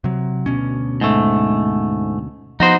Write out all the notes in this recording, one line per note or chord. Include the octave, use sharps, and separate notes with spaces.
C3 F#3
D2 B2 C#4
G#2 A3
F3 B3 D#4 F#4 C5